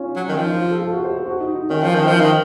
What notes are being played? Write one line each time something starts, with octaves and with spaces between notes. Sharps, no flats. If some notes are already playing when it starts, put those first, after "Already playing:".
Already playing: C#4 D#4 F4
F#3
D#3 C#4
F3 D#4
D#4
F4
A4
F4
A4
F#4
C5
A4
F#4
D#4
D#4
D#3 C#4
F3
D#3
F3
D#4
D#3